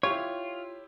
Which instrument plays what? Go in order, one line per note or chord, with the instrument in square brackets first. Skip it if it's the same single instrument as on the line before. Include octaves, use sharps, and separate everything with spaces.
[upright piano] E4 G4 [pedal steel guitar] F4 [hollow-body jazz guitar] C#5